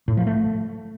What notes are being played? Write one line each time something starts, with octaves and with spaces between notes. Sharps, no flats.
A2
F3
A3